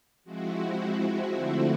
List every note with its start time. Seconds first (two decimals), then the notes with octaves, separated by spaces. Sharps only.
0.24 F3 G#3 C4 E4 F#4
1.34 D3 F3 A3 C4 E4 F#4